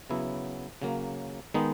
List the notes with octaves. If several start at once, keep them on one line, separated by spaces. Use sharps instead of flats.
C#3 F#3 B3 E4
C#3 F#3 A#3
D#3 G#3 B3 D#4